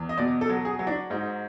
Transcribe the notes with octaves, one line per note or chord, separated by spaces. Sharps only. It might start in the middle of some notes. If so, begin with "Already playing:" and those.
Already playing: E2
D#5
B2 D5
A4
F#3
G#4
F#3
D4
G#2 D#4